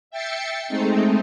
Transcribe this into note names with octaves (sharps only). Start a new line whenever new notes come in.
E5 G5 A6 C7 C#7
G#3 A3 C4 D#4